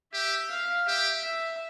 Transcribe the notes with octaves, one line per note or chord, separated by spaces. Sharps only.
G4 E5
F5
G4 E5
E5